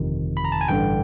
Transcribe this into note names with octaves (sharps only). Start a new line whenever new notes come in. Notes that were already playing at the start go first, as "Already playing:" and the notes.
Already playing: G1 F2 C3 D#3
B5
A#5
A5
G#5
A1 G2 D3 G5